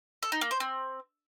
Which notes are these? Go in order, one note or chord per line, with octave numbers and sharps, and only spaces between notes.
A4
D#4
A#3
C5
C4